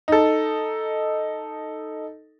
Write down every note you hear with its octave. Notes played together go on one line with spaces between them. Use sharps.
D#4 A4